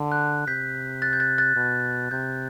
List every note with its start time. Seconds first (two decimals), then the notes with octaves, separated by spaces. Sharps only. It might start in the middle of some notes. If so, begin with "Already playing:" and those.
Already playing: D3
0.12 F#6
0.47 C3 G6 B6
1.02 F#6 A6
1.13 G6
1.20 F#6 A6
1.38 F#6 A6
1.56 B2
2.11 C3 G6